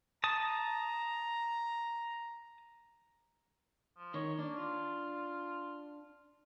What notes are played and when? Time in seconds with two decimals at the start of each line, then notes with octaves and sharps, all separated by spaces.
0.24 A5 A#5 D#6
3.97 F3
4.14 D#3 C#5
4.39 A#3 D4
4.57 F4